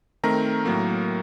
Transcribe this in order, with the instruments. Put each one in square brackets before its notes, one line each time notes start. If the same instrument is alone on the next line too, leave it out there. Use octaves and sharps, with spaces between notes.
[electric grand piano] D#3 A3 C4 A#4 A#5
A2 F#3 A#3